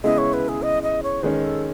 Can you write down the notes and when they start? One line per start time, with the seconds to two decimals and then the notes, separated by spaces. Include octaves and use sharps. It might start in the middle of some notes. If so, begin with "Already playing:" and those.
0.04 C#3 G#3 B3 E4 D#5
0.18 C#5
0.33 B4
0.49 G#4
0.63 D#5
0.83 D#5
1.03 C#5
1.23 D#3 G#3 C#4 B4
1.43 A4